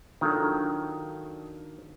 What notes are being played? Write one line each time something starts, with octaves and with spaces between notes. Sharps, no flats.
D#3 F#3 D4 F4 A4